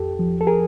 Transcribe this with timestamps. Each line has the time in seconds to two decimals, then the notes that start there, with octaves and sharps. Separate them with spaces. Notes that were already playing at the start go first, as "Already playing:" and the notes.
Already playing: F2 G4 A4
0.19 F3
0.41 A4
0.47 G#4 A#4